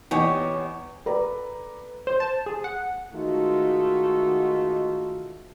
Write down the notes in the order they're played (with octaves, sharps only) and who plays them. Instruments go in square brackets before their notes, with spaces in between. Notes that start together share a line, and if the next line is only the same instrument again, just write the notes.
[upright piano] E2 G#5 [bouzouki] G4 C#5 D#5
[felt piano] A4 B4 D5 A#5
[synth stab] C5
A5
G#4
F#5
[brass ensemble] D#3 G#3 A3 D#4 F4 F#4